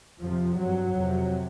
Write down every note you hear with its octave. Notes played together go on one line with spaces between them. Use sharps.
F2 C3 F3
G2 F#3
F2 C3